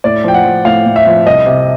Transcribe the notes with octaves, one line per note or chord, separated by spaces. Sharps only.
A2 D5
F3 G5
F#5
F3
A2 F5
A2
E5
F3
C2 D#5
C3